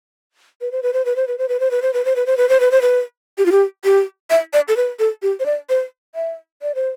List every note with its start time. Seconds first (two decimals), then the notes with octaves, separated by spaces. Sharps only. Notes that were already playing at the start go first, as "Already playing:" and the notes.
0.61 B4
0.72 C5
0.83 B4
0.93 C5
1.05 B4
1.16 C5
1.28 B4
1.38 C5
1.49 B4
1.60 C5
1.71 B4
1.82 C5
1.94 B4
2.05 C5
2.16 B4
2.26 C5
2.37 B4
2.49 C5
2.60 B4
2.72 C5
2.82 B4
3.38 G4
3.46 F4
3.52 G4
3.85 G4
4.30 E5
4.53 D5
4.68 A4
4.77 B4
4.99 A4
5.22 G4
5.40 C5
5.46 D5
5.69 C5
6.15 E5
6.62 D5
6.75 C5